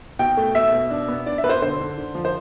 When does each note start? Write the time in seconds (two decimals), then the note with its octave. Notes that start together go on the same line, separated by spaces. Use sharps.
0.19 B2 G5
0.37 A3
0.55 B2 E5
0.73 B2
0.91 D4
1.08 B3
1.26 D4 D5
1.38 E5
1.43 B2 B4
1.49 C5
1.62 D3 C5
1.80 D3
1.98 D3
2.15 F3
2.25 C5